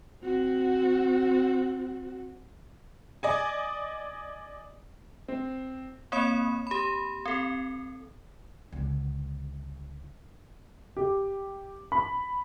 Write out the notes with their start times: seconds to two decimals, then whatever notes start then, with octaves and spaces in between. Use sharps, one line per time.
0.22 C4 F#4
3.23 D5 D#5 G#5
5.28 C4
6.12 A#3 C4 C#5 B5 D#6
6.67 G4 B5
7.25 C4 A4
8.72 C#2 D3
10.97 G4
11.92 B5